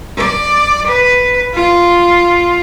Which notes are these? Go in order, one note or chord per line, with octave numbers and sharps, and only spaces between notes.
D5
B4
F4